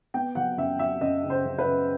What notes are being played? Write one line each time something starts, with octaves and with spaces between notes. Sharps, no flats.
B3 G5
F#3 F#5
F#2 E5
F#3 E5
F#2 D#5
C#3
C5
F#2
B4
F#2